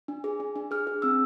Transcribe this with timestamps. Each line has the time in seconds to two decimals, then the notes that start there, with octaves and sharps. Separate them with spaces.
0.08 D4
0.24 G#4
0.40 D4
0.56 D4
0.71 G#4 F6
0.87 G#4
1.02 C4 E6